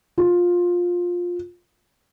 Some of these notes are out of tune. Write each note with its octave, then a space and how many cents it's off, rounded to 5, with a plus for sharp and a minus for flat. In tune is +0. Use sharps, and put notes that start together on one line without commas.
F4 +15